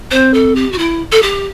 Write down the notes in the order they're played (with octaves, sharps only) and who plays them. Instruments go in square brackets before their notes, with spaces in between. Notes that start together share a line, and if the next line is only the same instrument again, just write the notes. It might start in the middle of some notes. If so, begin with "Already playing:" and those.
[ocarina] C4 [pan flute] C5
[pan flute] A4
G4
F#4
E4
A4
G4